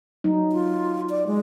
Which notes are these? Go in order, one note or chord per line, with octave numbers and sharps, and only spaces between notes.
F#3 D#4
F4
D5
G#3